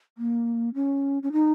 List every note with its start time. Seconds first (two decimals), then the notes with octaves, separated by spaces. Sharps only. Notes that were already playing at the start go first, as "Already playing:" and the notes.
0.18 A#3
0.74 C#4
1.23 C#4
1.32 D#4